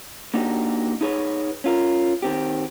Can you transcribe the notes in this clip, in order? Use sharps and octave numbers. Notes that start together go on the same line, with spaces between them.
A#3 D4 D#4 F#4 G4
D#4 E4 G#4 B4 C#5
C#4 F4 A#4
D#3 C4 G4